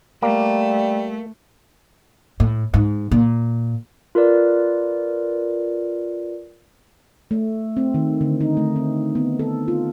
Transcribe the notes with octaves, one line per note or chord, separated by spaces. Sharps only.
G3 A3 A#3
A2
G#2
A#2
F4 A#4 B4 D5
A3
C4
D#3
D3
D#4
A3
C4
B3
A4
F4